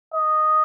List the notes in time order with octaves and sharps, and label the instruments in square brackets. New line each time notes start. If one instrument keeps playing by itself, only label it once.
[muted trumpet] D#5